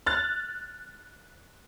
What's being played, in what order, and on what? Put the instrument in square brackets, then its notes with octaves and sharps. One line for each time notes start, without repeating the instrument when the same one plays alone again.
[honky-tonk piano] F6 F#6 A6